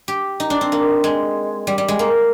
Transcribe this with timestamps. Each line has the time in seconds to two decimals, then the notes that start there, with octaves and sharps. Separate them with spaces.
0.08 G4
0.40 D#4
0.50 D4
0.61 C4
0.72 A#3
1.04 G#3
1.67 G3
1.78 G3
1.88 G#3
1.99 A#3